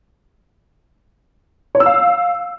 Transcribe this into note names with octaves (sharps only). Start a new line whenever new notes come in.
C#5
E6
F5